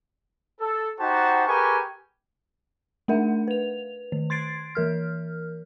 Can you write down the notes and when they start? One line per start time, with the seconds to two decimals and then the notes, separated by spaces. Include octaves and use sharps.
0.60 A4
1.00 D#4 F#4 G4 C5 F#5 A5
1.47 G4 G#4 A#4 B4 G#5 C#6
3.08 A3 D4 A#4 E5 F#5
3.48 B4 F7
4.12 D#3
4.30 C6 G#6 A6 C7 D7
4.75 E3 A#4 F6